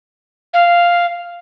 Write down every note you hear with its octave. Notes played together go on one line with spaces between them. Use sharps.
F5